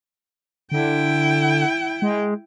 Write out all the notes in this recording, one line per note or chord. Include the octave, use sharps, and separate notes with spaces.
D3 E4 G5
G#3